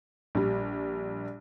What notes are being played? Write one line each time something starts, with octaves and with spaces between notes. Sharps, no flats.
A#1 G3